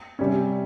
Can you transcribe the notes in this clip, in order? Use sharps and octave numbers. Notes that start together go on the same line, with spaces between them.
C3 G3 C#4